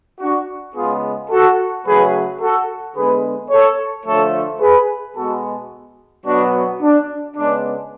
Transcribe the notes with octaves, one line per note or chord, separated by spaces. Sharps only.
D4 F#4
C#3 G#3 B3 F4 G#4
F#4 A4
C#3 F#3 A3 G#4 B4
F#4 A4
D3 G#3 B3 G#4 B4
A4 C#5
D3 F3 A3 A4 C#5
G#4 B4
B2 G#3 B3 F#4 A4
B2 F#3 B3 D4 F#4
D4
C#3 G#3 B3 D4